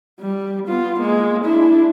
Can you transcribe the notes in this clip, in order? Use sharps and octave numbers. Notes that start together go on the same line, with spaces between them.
G3
B3 F4
G#3 A#3
D4 E4